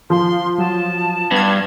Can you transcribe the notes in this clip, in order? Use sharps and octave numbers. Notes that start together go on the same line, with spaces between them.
F3 C6
F#3 A5
G2 B3 G#6